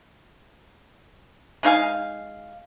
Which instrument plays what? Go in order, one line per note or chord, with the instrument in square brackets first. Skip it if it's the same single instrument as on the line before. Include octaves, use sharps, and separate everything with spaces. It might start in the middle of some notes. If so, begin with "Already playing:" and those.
[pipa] G#3 D#4 F5 G#5